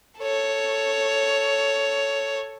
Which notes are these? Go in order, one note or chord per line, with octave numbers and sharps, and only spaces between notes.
A4 C#5